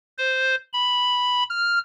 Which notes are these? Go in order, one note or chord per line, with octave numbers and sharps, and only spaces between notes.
C5
B5
F6